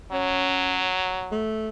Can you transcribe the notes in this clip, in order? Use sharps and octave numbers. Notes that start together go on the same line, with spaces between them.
F#3 C#4
A3